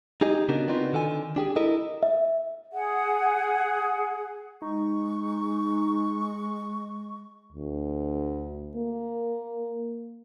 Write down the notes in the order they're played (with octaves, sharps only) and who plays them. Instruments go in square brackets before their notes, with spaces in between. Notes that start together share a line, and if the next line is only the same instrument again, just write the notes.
[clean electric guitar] D#4 G4 G#4 D#5
C#3 B3 D4 F#4 A#4
B3 C4 D4 D#4 F4 F#4
D3 D#3 A4 F#5 G#5
D4 G4 G#4
E4 A4 A#4 D#5
[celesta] E5
[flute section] G#4 F#5
[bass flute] G#3 [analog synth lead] D#4 [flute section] C#6
[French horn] D2
A#3